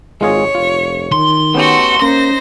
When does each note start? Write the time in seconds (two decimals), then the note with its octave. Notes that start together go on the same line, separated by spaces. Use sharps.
0.21 G#1 G#3 F4 G#4 C#5
0.55 F1 F4
1.12 D#3 C6
1.54 A3 B3 C#4 F#4 G4
2.02 A#3 C#4 D#4 C5 A#6